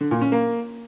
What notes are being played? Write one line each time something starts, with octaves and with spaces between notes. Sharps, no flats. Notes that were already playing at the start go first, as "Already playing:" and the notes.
D3
A#2
C#4
A#3